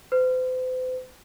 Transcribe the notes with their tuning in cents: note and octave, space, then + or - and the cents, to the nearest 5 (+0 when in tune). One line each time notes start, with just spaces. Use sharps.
C5 -45